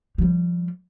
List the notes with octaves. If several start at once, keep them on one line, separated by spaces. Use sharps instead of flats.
F3 G3